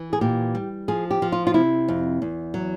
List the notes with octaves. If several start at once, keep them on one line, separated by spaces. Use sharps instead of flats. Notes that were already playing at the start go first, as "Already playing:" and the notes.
Already playing: E3
G#4
A#2 G4
G3
F3 G#4
G4
F3
F4
F4
C3 E4
F2
E2
F#3